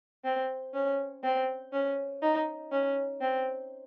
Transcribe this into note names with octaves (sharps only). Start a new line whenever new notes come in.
C4
C#4
C4
C#4
D#4
C#4
C4